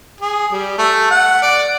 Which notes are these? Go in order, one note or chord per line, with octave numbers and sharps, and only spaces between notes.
G#4
G3
A3
F#5
D5